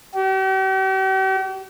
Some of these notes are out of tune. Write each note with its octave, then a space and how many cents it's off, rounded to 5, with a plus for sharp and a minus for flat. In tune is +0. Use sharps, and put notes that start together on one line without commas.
G4 -45